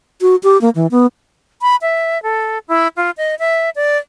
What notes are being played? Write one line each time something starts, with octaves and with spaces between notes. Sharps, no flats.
F#4
G4
A#3
E3
B3
B5
E5
A4
E4
F4
D#5
E5
D5